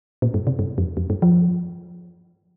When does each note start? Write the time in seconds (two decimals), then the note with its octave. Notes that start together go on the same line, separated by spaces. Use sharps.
0.22 A#2
0.34 G2
0.47 C3
0.59 G2
0.78 F2
0.97 F2
1.10 G2
1.22 F3